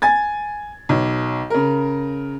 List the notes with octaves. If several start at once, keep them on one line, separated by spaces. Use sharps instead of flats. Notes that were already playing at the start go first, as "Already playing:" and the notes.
G#5 G#6 A6
B1
C#3 A#4